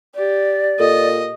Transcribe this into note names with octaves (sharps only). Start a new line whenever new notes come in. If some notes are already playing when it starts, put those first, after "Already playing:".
G4 D5
A#2 A4 D#5